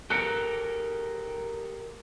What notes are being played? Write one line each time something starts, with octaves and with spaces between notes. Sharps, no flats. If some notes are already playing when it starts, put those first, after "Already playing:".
G4 A4 A#4 F#6 C#7 D7